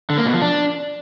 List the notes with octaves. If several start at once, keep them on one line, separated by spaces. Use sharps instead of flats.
D3
A#3
B2
F3
D4